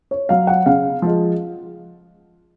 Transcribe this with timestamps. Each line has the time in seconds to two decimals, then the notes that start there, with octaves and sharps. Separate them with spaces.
0.11 C#5
0.29 F#3 F5
0.47 F#5
0.66 C#3 F5
1.02 F3 G#3